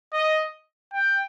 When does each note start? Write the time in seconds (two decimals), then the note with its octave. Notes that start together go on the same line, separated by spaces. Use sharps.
0.13 D#5
0.93 G5